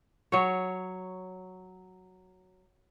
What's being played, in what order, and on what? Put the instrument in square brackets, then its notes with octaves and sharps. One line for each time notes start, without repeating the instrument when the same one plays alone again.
[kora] F#3 C#5